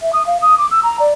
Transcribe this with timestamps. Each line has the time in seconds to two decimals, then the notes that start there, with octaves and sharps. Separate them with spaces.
0.01 E5
0.13 D#6
0.26 F5
0.41 D#6
0.58 D6
0.71 E6
0.83 A#5
0.99 D5